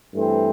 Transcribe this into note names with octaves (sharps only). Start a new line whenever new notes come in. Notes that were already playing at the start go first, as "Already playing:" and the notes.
G2 E3 A3 C4